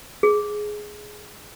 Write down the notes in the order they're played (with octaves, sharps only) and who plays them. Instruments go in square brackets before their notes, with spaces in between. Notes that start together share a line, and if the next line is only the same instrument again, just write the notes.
[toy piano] G#4